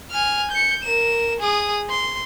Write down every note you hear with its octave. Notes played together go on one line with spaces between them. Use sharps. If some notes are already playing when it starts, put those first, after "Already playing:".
G#5 F6
G6 C#7
A#4 E7
G#4 D#6
C6